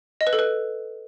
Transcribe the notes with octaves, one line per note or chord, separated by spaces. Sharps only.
D#5
B4
A4
B4